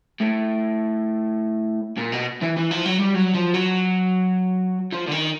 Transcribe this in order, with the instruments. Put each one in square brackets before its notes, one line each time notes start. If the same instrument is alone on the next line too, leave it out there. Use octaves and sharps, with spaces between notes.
[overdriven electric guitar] A2
A#2
B2
E3
E3
F3
F#3
G3
F#3
F3
F#3
F3
D3
D#3